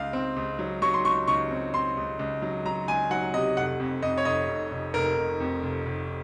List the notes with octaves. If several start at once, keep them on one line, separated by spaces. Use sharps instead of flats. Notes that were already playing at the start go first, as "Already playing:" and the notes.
Already playing: C#2 F5
C4
C#2
F#3
F#3 C#6
C6
C#2 C#6
C#2 C#6
C4
C4 C6
C#2
C#2
F#3
F#3 A#5
C#2 G#5
F#3 F#5
C3 D#5
F1 F#5
F2
F2 D#5
C#5
F1 D#5
F1
F1
F1 A#4
F1
F2
F1
F1